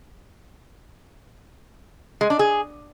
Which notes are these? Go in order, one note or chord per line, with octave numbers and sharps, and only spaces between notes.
G#3
D4
G#4